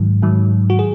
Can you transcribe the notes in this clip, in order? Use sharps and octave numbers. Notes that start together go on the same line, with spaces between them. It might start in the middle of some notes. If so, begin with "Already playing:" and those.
Already playing: G#2 D#3 F#3
G#2 D#3 F#3
F#4
G#4